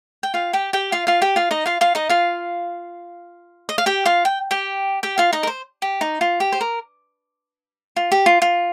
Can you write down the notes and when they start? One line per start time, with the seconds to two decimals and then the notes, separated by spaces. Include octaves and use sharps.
0.23 G5
0.34 F4 F5
0.53 G4 G5
0.73 G4 G5
0.92 F4 F5
1.07 F4 F5
1.22 G4 G5
1.36 F4 F5
1.51 D#4 D#5
1.66 F4 F5
1.81 F4 F5
1.95 D#4 D#5
2.09 F4 F5
3.69 D#5
3.78 F5
3.86 G4 G5
4.05 F4 F5
4.25 G5
4.51 G4 G5
5.03 G4 G5
5.18 F4 F5
5.33 D#4 D#5
5.43 A#4
5.47 C5
5.82 G4
6.01 D#4
6.21 F4
6.40 G4
6.52 C5
6.61 A#4
7.96 F4
8.12 G4
8.26 F4
8.42 F4